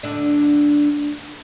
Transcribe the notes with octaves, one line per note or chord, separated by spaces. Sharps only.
D2 D3 D4